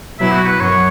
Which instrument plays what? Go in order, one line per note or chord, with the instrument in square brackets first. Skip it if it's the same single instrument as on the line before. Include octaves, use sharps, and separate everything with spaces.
[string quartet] B2 F#3 E4 [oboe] E5
[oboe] F#4
B4
[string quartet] F#2 F#3 [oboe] C#5